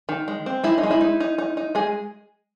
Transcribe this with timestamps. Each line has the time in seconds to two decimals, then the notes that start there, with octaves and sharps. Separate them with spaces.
0.09 D#3
0.28 G#3
0.46 C4
0.64 G#3 E4
0.78 D#4
0.83 G#3
0.91 E4
1.01 D#4
1.20 D#4
1.38 D#4
1.57 D#4
1.75 G#3 G#4